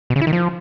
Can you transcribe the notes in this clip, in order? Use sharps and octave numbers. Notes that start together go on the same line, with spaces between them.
B2
C#3
E4
D#3
F3